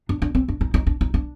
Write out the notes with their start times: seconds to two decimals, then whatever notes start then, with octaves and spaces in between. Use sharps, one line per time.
0.09 D4
0.22 D4
0.35 C4
0.48 D4
0.61 D#4
0.74 D#4
0.87 D4
1.01 D#4
1.14 D4